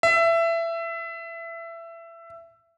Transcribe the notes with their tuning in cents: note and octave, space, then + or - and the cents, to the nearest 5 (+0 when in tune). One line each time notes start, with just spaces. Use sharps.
E5 +20